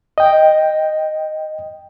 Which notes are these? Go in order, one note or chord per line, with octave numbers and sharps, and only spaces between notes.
D#5 G5